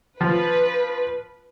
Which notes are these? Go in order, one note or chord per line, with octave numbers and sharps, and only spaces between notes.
F3 B4